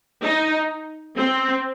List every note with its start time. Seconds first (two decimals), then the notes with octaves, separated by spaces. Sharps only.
0.22 D#4
1.18 C4